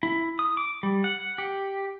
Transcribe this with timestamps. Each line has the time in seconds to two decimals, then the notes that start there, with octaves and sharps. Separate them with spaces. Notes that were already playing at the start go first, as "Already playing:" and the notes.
0.03 E4
0.39 D#6
0.57 D6
0.83 G3
1.04 F#5
1.38 G4